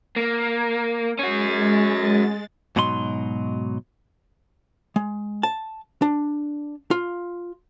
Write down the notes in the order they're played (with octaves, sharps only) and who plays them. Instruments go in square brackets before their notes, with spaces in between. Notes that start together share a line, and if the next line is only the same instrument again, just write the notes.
[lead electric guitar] A#3
[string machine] G#3 A6 [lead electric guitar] C#4 F#4
[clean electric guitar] G#2 B2 F#3 D#4 B5 C6
[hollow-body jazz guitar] G#3
A5
D4
F4